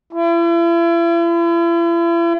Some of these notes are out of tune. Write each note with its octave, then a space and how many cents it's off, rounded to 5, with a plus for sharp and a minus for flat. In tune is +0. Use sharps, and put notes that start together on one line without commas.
E4 +40